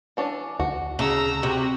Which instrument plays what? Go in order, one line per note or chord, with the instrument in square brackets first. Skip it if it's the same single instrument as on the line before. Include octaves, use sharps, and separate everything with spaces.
[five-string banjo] E3 C#4 D4
[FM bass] D2 [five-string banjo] F#4
[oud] C#3 [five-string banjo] A3 [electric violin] A#5 E6
[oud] C3 [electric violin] F#4